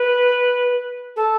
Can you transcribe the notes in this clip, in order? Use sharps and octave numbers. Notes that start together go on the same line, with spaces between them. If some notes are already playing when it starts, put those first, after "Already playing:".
Already playing: B4
A4